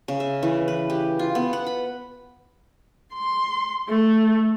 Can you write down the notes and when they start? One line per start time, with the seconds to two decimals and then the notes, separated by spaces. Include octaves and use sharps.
0.08 C#3
0.20 E5
0.43 E3
0.68 B4
0.90 G4
1.19 F4
1.35 B3
1.53 F#5
1.66 B5
3.14 C6
3.89 A3